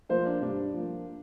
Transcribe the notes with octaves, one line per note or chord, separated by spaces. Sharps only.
F3 A#3 C5
D4
G2 D4
F3 A#3